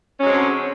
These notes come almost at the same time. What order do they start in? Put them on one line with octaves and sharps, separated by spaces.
C#4 F#3 G#3 C4 D3